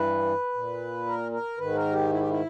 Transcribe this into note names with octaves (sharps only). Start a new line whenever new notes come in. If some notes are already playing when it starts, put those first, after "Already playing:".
Already playing: G2 E3 B4
A#2
A#4
A#4
G#2 D#3 B4
A#4
G4
E4
G4
E4